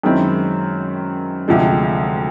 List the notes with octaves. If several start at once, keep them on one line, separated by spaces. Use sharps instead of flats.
F#2 D#3 G#3 C4 E4
D2 C3 F3 G#3